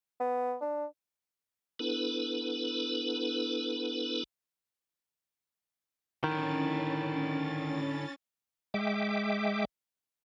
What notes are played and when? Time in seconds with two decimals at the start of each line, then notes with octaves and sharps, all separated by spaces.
0.20 B3
0.61 D4
1.79 B3 D4 E4 A4 B4
6.24 D3 D#3 C#4 E4 A6
8.74 G#3 E5 G5 D6